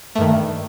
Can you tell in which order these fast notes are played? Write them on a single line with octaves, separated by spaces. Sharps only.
A3 G2 D#3